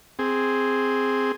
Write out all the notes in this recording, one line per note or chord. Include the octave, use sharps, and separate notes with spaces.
C4 G#4